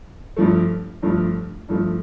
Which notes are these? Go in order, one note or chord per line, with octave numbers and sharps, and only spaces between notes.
G2 F3 A3
G2 F3 A3
G2 F3 A3